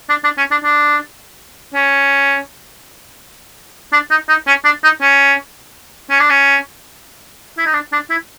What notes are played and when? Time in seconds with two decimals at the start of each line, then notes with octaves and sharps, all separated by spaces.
0.09 D4
0.24 D4
0.38 C#4
0.51 D4
0.64 D4
1.74 C#4
3.93 D4
4.10 D#4
4.29 D#4
4.47 C#4
4.65 D4
4.83 D#4
5.01 C#4
6.10 C#4
6.19 D4
6.30 C#4
7.58 E4
7.66 D#4
7.73 D4
7.93 D4
8.10 E4